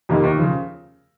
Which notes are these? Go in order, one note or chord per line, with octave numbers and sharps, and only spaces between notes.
F2 C3 D#3 A#3
D#2
C#3 F3